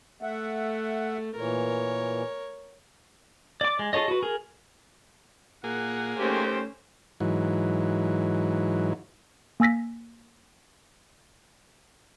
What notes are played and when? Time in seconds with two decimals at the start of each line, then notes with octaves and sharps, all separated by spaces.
0.22 A3 E5 F#5
1.36 A#2 E3 A#4 C#5
3.61 D5 D6
3.79 G#3
3.93 F4 G#4 A4 C#5 D#5
4.08 F#4 B4
4.23 G#4 A#4
5.64 A#2 A#3 G#4 F#5
6.19 D#2 A3 C4 C#4 G4 C5
7.20 G#2 E3 F#3
9.60 A#3 G#5 E6 A#6 B6